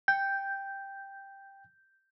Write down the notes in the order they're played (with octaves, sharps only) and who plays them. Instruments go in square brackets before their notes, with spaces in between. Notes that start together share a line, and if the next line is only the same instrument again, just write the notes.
[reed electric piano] G5 [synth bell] G6